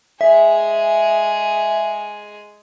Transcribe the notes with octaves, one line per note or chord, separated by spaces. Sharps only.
G#3 G#4 E5